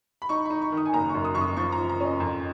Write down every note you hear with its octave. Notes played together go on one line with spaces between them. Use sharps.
B5
D#4 C#6
D#4 B5
C#6
D#3
D#6
G#5
F#1 A#5
C#6
F#2
D#6
F#2 C#6
D#6
F3 C#6
A#5
F3
A#5
C#4 D#5
F2